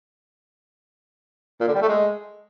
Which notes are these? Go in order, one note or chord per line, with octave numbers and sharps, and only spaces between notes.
A#2
D3
G3
A3
G#3